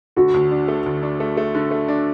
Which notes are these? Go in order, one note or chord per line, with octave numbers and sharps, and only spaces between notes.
D3 F#4
D2
D4
A3
D2
D4
A3
A3
D3
A3
D4